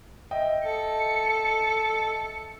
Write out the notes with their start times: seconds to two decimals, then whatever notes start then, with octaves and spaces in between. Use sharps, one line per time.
0.31 D#5 E5 G5
0.65 A4 C#7